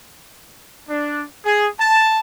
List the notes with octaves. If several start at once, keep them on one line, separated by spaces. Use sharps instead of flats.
D4
G#4
A5